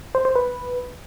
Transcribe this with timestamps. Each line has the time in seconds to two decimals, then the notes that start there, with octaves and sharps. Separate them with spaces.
0.15 C5
0.25 C5
0.36 B4